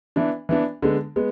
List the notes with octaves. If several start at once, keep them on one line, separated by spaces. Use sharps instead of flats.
E3 B3 D4
E3 B3 D4
D3 G#3 B3
G#3 B3